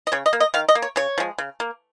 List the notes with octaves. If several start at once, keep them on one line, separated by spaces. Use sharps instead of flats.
D#5
C#3 C#5
D#5
A#3
D#5
D#3 F5
D#5
A#3
C#5
C#3 C#5
F3 G#3
C#3
A#3